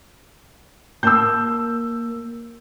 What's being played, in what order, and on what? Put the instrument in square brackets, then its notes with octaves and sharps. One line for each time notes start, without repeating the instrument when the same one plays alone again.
[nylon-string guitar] A#3 A5 [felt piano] E6 G6